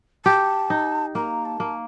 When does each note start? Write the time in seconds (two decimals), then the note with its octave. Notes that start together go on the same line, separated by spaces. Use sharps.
0.25 G4 A5
0.70 D#4
1.15 A#3 A#5
1.45 A5
1.60 A#3